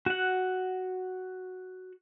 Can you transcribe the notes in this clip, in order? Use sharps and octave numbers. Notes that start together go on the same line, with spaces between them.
F#4 F#5